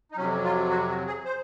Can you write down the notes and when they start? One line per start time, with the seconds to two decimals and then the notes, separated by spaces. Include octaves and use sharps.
0.12 D#4
0.17 F2 C3 F#3 C#4
0.44 F4
0.71 F#4
0.89 F#4
1.07 G#4
1.25 C5